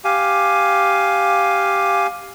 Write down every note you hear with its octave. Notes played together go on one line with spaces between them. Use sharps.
G4 F5 G#5